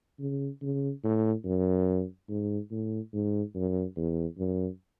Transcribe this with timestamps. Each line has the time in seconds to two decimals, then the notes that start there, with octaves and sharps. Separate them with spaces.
0.19 C#3
0.62 C#3
1.04 A2
1.45 F#2
2.29 G#2
2.71 A2
3.13 G#2
3.55 F#2
3.97 E2
4.38 F#2